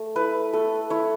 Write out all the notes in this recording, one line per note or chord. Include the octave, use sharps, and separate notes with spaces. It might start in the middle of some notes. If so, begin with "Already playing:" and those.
Already playing: A3
E4 B4
A3 A4
E4 C#5